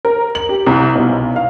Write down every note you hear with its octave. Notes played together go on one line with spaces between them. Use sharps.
A#4
F#7
G4
C2
B1
F5